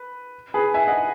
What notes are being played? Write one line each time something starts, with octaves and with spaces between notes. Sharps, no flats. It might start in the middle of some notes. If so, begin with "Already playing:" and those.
Already playing: B4
G#4 B4
E5 G#5
D#5 F#5